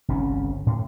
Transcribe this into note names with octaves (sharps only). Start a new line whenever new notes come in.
G1 C2 C#3 C#4
A2